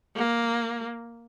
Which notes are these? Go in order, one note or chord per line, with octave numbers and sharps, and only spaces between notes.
A#3